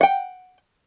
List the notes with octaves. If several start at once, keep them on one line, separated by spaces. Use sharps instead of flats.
F#5 G5